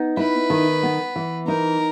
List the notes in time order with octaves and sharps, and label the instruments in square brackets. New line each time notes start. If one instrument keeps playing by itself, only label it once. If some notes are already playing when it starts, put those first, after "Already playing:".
Already playing: [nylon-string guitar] B3 D#4
[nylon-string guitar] E4 [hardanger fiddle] B4
[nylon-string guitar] D#3
B3
E3
[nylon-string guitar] D#4 [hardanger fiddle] A#4